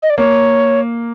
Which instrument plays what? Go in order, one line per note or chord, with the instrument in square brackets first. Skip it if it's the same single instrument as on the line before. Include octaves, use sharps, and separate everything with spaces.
[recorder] D#5
D5
[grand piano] A#3 [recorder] C#5